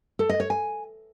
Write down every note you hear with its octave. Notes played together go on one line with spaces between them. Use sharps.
A4
D#5
C#5
G#5